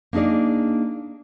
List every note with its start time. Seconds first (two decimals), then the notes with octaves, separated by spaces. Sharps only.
0.13 A#3 D4 D#4 G#4 D5